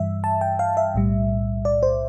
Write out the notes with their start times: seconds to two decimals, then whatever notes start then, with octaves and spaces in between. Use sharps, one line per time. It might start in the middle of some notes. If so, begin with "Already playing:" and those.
Already playing: G2 E3 G3 E5
0.24 A5
0.41 G5
0.59 F5
0.77 E5
0.94 B1 A2 G3
1.65 D5
1.83 C5